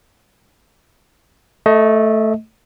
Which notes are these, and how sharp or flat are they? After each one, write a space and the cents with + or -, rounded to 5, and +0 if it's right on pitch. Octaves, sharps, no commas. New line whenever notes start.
A3 +0 D#5 +25